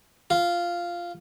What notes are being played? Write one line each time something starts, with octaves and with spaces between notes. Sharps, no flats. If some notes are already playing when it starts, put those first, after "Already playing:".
F4